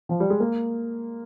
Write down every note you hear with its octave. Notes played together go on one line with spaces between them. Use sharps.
F3
G3
G#3
A#3